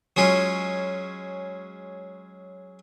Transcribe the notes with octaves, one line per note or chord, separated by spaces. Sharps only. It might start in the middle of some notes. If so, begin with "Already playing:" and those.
F#3 G#3 C#4 F4